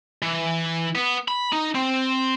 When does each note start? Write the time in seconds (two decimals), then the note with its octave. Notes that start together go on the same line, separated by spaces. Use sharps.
0.22 E3
0.95 B3
1.28 B5
1.52 D#4
1.75 C4